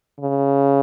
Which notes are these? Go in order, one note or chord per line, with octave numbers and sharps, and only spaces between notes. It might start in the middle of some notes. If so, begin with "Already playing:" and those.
C#3